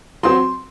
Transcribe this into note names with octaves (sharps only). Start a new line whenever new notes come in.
F#3 C4 C6